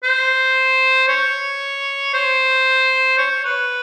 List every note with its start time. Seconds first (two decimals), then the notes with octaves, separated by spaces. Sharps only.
0.04 C5
1.09 C#5
2.14 C5
3.18 C#5
3.45 B4